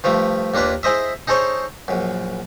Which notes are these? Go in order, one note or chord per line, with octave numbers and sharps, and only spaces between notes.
G2 F3 A3
D#2 A#3 D4 F4 B4
E4 G#4 C5 D#5 E5
D#4 G#4 A4 C5 C#5
A#1 F#2